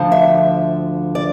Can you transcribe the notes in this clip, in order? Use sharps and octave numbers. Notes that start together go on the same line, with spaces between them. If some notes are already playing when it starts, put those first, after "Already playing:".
Already playing: D2 D3 F3
E5
D5